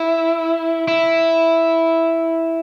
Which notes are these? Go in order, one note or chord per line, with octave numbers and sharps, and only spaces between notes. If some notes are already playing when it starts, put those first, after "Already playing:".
Already playing: E4
E4